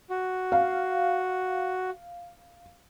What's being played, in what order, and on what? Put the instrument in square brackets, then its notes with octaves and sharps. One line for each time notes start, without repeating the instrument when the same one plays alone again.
[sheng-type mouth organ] F#4
[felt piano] F5